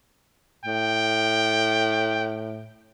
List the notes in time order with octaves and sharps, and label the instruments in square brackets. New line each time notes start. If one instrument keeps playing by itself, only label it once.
[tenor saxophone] A2 [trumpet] G5